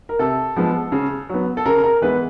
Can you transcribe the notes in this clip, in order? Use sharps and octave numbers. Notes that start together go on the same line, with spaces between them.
A#4
C3 A4
F3 G#3 B3
C#3
F#3 B3
A4
C#3 A#4
A#4
E3 G#3 B3 B4